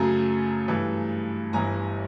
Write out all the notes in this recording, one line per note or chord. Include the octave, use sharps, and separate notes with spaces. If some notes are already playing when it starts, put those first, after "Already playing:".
Already playing: F#2 C#3 F#3 A3 G#5 A#5
G2 E3 A3
G1 G2 E3 G#5 A#5